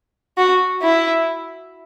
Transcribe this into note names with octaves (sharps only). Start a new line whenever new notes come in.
F#4
E4